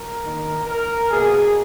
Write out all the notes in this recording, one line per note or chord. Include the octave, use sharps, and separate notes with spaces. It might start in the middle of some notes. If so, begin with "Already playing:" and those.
Already playing: A#4
D#3 A#3
A#4
B2 A#3 G#4